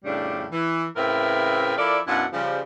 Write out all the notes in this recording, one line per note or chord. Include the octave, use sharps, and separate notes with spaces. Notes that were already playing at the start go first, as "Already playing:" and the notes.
F2 A2 C#3 G3 D4
E3
A2 C#3 C4 A#4 B4 E5
F3 E4 A4 A#4 D5
F#2 B2 D4 E4 F4 F#5
C#3 F3 G3